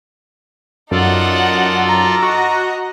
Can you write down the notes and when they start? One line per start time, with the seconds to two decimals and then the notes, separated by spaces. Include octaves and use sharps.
0.91 F#2 D#4 F4 A4 D5 F#5
1.87 A#5
2.23 F#4 D#5